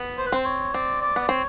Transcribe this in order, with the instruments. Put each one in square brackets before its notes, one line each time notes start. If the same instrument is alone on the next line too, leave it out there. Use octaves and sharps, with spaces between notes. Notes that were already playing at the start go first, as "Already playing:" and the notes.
Already playing: [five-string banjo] B3
[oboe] C5
B4
[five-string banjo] C4 [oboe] C5
[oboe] C#5
[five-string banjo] C4 [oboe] D5
[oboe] D5
[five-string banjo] B3 [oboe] D5
[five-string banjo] C4 [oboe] C#5